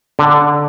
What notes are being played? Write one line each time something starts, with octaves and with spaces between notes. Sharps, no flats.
D3